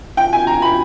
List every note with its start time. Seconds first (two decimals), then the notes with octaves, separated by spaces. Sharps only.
0.17 G5
0.33 G#5
0.47 A#5
0.62 B5